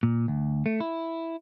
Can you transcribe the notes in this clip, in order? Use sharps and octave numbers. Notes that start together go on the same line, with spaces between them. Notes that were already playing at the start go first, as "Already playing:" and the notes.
A#2
D2
A3
E4